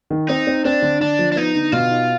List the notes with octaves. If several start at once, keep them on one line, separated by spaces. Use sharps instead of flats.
D#3
C4 D#4
C4
C4 D4
D3
D3 D4
F3
D4
B3 D#4
D3
B2 F4
D#4